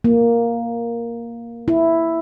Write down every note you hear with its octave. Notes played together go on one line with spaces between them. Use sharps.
A#3
E4